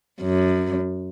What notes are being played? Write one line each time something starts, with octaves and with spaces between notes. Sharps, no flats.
F#2